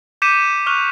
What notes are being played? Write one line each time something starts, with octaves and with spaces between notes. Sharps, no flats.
D6 G6 B6 C#7 D#7 E7
C#6 F6 F#6 D#7 F7